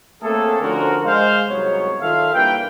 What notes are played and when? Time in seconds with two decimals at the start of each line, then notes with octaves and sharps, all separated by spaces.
0.23 A3 A#3 C4 C#4 G#4 A4
0.61 D3 F3 C#4 F#4 A#4
1.04 G#3 C5 F5
1.49 C2 G#2 F#3 B3 C#5
2.01 D#3 F4 A4 E5 F5
2.34 G2 E3 A#3 B4 G5